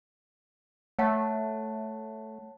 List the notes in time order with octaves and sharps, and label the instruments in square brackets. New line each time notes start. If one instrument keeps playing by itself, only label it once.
[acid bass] A3 [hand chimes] C#5 F#5 A5